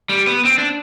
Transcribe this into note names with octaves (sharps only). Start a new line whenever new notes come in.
G3
B3
C4
D4